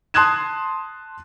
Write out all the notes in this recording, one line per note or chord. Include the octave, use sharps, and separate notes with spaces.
A5 C6 D#6 F#6 G#6 E7